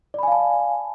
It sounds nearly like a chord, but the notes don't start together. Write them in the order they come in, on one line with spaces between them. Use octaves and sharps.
D5 B5 G#5 F5 A5